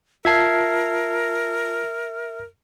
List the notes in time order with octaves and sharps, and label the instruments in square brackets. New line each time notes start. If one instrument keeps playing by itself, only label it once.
[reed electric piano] F4 A5 [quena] A#4 [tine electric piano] E5 G#6 C7